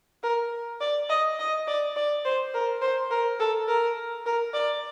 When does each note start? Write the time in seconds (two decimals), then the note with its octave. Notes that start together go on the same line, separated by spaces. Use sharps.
0.23 A#4
0.81 D5
1.09 D#5
1.39 D#5
1.67 D5
1.96 D5
2.25 C5
2.54 A#4
2.82 C5
3.11 A#4
3.40 A4
3.68 A#4
4.26 A#4
4.54 D5